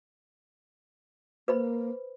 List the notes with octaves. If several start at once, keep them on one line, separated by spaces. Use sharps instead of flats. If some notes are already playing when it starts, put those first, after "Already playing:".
A#3 B4 C5 B5